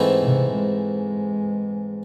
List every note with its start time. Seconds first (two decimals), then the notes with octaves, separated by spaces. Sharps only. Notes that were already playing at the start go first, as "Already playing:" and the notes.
Already playing: G#2 E3 A3 C4 E4
0.22 C3
0.55 G#3